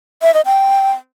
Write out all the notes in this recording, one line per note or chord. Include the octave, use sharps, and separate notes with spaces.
E5
D#5
G5